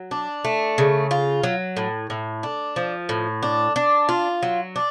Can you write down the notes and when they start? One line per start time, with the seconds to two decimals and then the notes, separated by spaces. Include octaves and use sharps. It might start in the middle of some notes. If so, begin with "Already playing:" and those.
Already playing: F#3
0.11 D4
0.45 A3
0.78 C#3
1.11 F4
1.43 F#3
1.77 A2
2.10 A2
2.43 D4
2.76 F3
3.09 A2
3.43 D4
3.76 D4
4.09 F4
4.43 F#3
4.76 D4